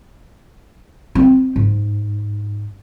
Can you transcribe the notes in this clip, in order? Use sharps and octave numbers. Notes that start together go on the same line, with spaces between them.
C4
G#2